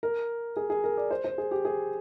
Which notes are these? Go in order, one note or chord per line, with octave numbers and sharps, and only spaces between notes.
A#4
G#4
G#4
A#4
D5
C5
C5
G#4
G4
G#4